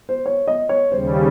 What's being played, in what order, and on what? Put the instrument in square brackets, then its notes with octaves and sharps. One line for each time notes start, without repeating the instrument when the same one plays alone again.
[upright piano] C5
C#5
D#5
C#5
[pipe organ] D#2 C#3 G3 [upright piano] C5